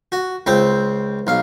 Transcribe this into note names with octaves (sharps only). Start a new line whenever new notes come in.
F#4
C#2 C4 C5
B1 F5